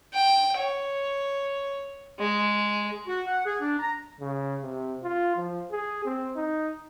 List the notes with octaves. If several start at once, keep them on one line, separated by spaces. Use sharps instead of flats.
G5
C#5
G#3
F#4
F#5
G#4
D4
A#5
C#3
C3
F4
F3
G#4
C4
D#4